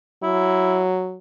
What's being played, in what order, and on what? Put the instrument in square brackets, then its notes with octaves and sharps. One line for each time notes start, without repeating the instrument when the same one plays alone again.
[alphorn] F#3 [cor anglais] E4